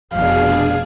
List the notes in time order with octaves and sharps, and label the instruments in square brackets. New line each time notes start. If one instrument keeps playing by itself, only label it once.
[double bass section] F1 B2 [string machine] D4 G#4 [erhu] F5